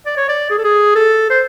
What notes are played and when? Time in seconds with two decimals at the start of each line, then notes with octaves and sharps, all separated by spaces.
0.06 D5
0.17 C#5
0.28 D5
0.50 G#4
0.58 A4
0.64 G#4
0.95 A4
1.30 C5